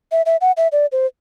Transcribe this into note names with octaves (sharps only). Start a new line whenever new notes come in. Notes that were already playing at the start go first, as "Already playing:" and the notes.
E5
E5
F#5
E5
D5
C5